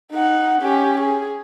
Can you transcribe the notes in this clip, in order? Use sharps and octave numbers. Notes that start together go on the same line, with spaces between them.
D#4 F#5
C#4 G4
G#4